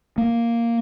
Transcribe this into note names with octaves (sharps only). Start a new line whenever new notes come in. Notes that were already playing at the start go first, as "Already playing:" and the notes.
A#3